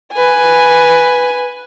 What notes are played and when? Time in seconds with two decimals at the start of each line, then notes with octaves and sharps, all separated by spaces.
0.13 B4 G#5